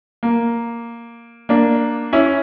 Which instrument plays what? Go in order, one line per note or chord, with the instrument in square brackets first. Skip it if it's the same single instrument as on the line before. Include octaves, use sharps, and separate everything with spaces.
[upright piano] A#3
A#3 D4
C#4 E4